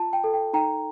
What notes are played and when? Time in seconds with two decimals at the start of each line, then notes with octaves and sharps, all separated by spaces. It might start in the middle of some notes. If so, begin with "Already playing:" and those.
Already playing: F4 A5
0.13 G5
0.24 A4
0.34 G5
0.53 D#4 G5 A#5